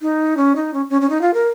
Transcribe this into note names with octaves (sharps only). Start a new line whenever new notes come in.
D#4
C#4
D#4
C#4
C#4
C#4
D#4
F4
A#4